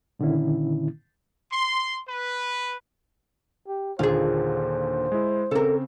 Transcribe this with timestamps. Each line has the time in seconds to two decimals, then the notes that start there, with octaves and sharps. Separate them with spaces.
0.19 A#2 D3 D#3 C#4 E4
1.51 C6
2.07 B4
3.68 G4
3.99 D#2 A#2 D3 F4 G#4 C5
5.12 G#3 E4
5.51 C#3 C4 A4 A#4